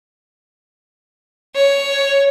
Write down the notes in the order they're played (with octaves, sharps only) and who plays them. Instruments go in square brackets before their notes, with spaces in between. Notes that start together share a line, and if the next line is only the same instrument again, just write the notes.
[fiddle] C#5